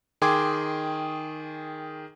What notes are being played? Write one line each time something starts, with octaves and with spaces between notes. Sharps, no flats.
D#3 G#4 G5 C6 D6 G#6